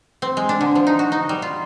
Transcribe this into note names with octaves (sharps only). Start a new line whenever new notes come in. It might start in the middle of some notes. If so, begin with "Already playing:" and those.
C4
G#3
D4
D3
F3
D#4
F#4
D#4
G3
F4